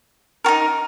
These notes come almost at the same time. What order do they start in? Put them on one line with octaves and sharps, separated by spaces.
F#4 A#4 D#4